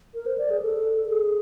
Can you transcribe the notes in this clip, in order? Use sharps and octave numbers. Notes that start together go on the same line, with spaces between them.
A#4
C5
D5
G#4
A4
A4
G#4